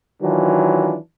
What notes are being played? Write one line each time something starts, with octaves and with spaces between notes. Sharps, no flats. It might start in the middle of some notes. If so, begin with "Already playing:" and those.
D#3 E3 F#3 D4 F4